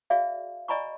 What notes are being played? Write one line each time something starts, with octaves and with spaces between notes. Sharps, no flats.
F#4 G#4 D5 E5 F5
D5 D#5 G#5 A#5 B5 C#6